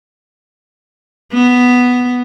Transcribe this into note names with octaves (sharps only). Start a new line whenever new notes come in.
B3